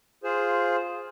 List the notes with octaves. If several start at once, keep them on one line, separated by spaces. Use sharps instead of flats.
F4 G#4 C5